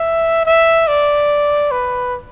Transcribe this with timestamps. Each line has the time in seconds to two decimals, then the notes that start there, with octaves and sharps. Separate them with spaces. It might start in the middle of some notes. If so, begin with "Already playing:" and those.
Already playing: E5
0.46 E5
0.88 D5
1.71 B4